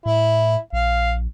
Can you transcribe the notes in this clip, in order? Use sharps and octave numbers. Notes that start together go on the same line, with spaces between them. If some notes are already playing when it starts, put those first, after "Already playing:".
A2 E4
A#1 F5